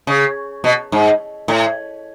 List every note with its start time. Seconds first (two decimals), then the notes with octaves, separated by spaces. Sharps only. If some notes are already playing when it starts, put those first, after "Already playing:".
0.07 C#3
0.64 B2
0.92 G#2
1.48 A2